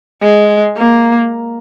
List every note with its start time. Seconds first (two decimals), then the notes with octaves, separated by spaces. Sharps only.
0.22 G#3
0.77 A#3